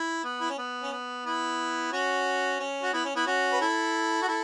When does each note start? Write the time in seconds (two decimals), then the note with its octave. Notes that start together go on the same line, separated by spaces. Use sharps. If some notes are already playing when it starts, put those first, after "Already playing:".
Already playing: E4
0.24 B3
0.41 E4
0.50 C#4
0.58 B3
0.82 C#4
0.91 B3
1.25 B3 E4
1.92 C#4 F#4
2.60 C#4
2.83 F#4
2.93 B3 E4
3.05 C#4
3.15 B3 E4
3.26 C#4 F#4
3.52 B4
3.60 E4 A4
4.22 F#4
4.28 E4 A4